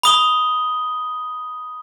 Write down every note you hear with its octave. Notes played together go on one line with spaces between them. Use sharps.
B5 D#6 G7